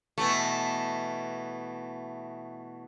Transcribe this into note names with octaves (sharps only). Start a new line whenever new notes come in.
B2 E3 A3